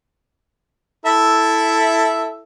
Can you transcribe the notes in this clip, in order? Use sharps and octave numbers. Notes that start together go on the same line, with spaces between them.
E4 A4 E5